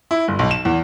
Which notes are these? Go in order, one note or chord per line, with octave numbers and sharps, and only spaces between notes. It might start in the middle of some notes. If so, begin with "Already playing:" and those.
E4
G1
B1
E7
E2